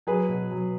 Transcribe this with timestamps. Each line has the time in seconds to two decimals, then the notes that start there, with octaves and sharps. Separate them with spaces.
0.07 F#3 G#4 B4
0.29 B2
0.51 F#3